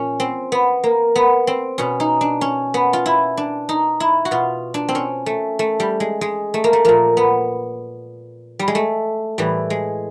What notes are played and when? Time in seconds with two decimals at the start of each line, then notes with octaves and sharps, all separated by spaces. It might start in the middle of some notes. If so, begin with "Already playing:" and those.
Already playing: A#2 F3 C#4
0.20 C4
0.52 B3
0.84 A#3
1.16 B3
1.47 C4
1.78 B2 C#4
2.00 D#4
2.21 D4
2.41 C#4
2.74 B3
2.93 F4
3.06 E4
3.37 D4
3.69 D#4
4.00 E4
4.25 F#4
4.31 B2 F4
4.74 D4
4.89 C4
4.95 C#4
5.26 A3
5.59 A3
5.80 G3
6.00 G#3
6.21 G#3
6.54 A3
6.64 A#3
6.73 A3
6.85 A#2 F3 A#3
7.17 B3
8.59 G3
8.68 G#3
8.75 A3
9.38 A2 E3 G3
9.70 G#3